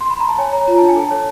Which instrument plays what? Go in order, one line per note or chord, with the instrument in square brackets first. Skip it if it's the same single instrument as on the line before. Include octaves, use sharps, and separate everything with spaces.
[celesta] C6
B5
A#5
A5
C#5 G#5
C#5 A#5
F4 A#5
D4 A5
G#5
A4 A5
C#5